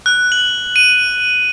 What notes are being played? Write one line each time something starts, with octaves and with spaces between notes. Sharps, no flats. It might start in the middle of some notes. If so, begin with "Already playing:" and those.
F#6
F#7
D#7